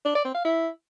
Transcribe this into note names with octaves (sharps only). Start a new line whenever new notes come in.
D4
D5
C4
F5
E4